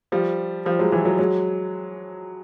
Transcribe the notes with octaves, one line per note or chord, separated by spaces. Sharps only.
F3 G3
F3 G3
F#3 G#3
E3 F#3
F#3 G#3
F#3 G#3